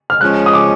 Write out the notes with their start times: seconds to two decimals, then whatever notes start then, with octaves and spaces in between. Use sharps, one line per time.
0.10 F6
0.21 F3 G#3 C#4 F#6
0.46 D#6
0.53 D6